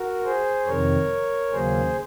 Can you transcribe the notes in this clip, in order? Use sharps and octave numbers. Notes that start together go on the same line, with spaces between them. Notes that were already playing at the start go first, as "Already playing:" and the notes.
Already playing: F#4 A#4
G#4 C5
F2 C3 D#3 A#4 C#5
D#2 C#3 F#3 A#3 G#4 C5